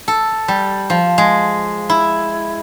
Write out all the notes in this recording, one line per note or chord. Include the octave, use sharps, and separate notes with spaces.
A4
G3
F3
G#3
E4